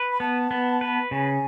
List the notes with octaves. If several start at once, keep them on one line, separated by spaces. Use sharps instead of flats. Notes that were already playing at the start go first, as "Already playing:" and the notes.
Already playing: B4
B5
B3 A5
B3
B4
C#3 G#5